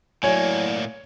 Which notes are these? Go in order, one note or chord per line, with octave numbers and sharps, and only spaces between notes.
A2 F#3 A#3 E4 C#5 D5 G#5